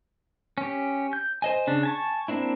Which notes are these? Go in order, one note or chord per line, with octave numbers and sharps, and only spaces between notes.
C#4 G4
G6
C5 D#5 G#5
C#3 D4
G#5 A5 C#6
A#3 C4 D4 E4